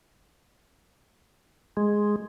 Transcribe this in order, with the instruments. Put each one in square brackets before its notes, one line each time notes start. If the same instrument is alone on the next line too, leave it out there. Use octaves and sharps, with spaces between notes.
[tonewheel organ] G#3